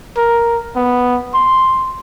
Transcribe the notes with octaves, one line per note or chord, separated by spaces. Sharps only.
A#4
B3
C6